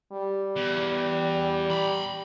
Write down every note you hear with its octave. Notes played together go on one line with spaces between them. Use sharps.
G3
E2
A#5 B5